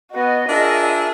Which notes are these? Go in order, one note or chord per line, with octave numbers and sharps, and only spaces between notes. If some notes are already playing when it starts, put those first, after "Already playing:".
B3 F#4 D#5
D4 F4 G#4 A#4 E5